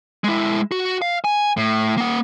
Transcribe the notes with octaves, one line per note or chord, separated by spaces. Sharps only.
G#3 E4
F#4
F5
G#5
A2
A#3 F#5